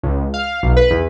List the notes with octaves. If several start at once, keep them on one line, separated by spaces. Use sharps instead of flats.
C#2
F5
B1
B4
E2